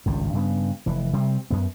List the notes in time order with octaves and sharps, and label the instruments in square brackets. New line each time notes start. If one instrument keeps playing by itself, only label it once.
[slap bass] G#1 C#2 G2
G2 C#3 B3
F1 E3
C3 G3 C4
F#2 B3